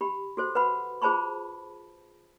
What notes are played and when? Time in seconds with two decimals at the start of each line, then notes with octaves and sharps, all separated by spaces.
0.01 G4 B5
0.37 F#4 A4 C5
0.55 B4 F#5 B5
1.02 F4 G#4 C5 A5 B5 C#6